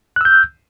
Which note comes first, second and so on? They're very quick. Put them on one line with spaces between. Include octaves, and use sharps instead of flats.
F#6 E6 G6